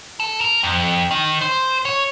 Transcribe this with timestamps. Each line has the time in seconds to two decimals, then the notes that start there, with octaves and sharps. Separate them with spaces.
0.20 A4
0.41 A#4
0.63 F2
1.11 D#3
1.41 C5
1.85 C#5